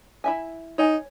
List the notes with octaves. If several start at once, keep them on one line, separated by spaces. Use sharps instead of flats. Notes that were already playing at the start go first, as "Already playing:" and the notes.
E4 E5 G#5
D#4 C#5 G#5